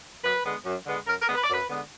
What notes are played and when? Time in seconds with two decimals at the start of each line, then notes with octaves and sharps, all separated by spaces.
0.24 F#2 B4
0.45 D3 G#3 B3
0.65 F#2
0.86 D3 G#3 B3
1.07 F#2 A#4
1.21 A#4
1.28 D3 G#3 B3
1.35 B4
1.44 D5
1.49 F#2 B4
1.70 D3 G#3 B3